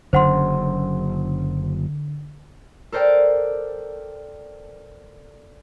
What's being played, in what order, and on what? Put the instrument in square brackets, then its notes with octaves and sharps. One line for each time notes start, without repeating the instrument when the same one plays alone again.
[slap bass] F#1 F#2 [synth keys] D3 [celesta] C5 F#5 C6
[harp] A4 A#4 C5 D5 G5